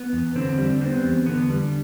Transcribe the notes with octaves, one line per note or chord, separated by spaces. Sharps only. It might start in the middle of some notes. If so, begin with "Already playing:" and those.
Already playing: B3
E2
D3 C4
G3
B3 C4
E2
D3 B3
G3